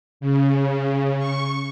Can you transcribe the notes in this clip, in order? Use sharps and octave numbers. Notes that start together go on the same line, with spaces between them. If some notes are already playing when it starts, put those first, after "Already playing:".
C#3
C#6